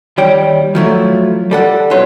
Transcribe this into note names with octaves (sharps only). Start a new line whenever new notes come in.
D#2 G3 C#5 G5
F3 F#3 A3 E4
G3 A4 F#5
B1 E4 B4 C#5 C6